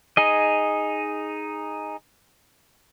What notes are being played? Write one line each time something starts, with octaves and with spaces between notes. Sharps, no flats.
D#4 G#4 D#5